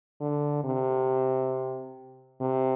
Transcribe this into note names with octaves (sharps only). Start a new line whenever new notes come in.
D3
C3
C3